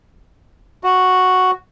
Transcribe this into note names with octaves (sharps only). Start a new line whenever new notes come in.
F#4